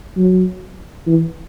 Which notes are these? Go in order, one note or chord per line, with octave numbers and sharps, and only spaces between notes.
F#3
E3